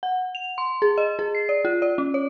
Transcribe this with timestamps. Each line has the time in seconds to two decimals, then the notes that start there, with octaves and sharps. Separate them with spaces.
0.03 F#5
0.35 F7
0.58 C6
0.82 G#4
0.98 D#5
1.19 G#4
1.35 C7
1.49 D5
1.65 F4
1.82 D5
1.98 C#4
2.14 C#5